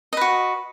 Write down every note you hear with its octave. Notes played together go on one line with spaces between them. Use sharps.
F#4 B4 D#5